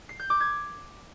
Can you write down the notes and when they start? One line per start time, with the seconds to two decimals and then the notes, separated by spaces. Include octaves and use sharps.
0.09 C7
0.20 G6
0.30 D6
0.40 G#6